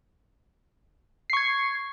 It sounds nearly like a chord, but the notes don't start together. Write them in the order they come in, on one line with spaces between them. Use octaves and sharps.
C7 C#6 G#6